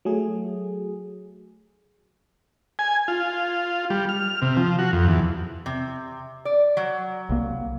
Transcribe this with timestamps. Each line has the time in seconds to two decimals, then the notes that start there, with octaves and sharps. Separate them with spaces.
0.05 F#3 A3 G#4
2.79 G#5
3.08 F4
3.90 G3
4.09 F6
4.42 C3
4.57 F3
4.79 F#4
4.93 F2
5.08 E2
5.66 C3
6.45 D5
6.77 F#3
7.29 C2 A#3